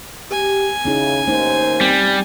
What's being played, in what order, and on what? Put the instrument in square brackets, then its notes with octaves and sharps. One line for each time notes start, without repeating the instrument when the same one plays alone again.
[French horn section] G4 [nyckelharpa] G#5
[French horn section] C#3 [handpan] C#4 D#4 E4
[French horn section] D#2 A#3 C5 [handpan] A3 D#4
[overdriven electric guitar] G3 [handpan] C4